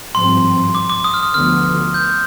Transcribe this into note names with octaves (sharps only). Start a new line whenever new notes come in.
G#1 G2 F3 C4 C6
D6
D6
D#6
F6
D#6
D2 D3 F3 B3 F6
G6